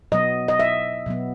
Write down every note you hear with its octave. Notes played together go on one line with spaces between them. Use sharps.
B2 F#3 B3 D#5
D#5
E5
B2 F#3 B3